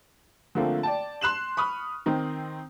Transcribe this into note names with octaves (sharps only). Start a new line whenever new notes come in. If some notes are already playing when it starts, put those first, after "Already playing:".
D3 F3 A3 A#3 C4
D5 G5 A5
C6 F#6 E7 F#7
B5 C#6 D#6 F6
D#3 C4 D#4